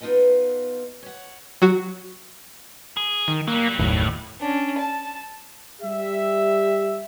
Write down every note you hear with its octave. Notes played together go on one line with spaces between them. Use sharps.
B3 D#4 F4 B4 D#5 A5
C#5 F#5
F#3 F#4
G#4
D#3
F#3 G3 A#3
F#1 D#2 A2
C#4 D4
A5
G3 G4 E5